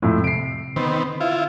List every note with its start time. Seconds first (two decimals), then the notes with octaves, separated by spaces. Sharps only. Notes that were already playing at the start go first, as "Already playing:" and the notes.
0.02 F2 A2 G#3
0.24 C3 C7 D7
0.76 D3 D#3 B3 C4
1.20 E4 F4